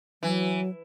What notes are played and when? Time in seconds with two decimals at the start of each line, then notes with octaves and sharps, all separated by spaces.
0.23 E3 F#3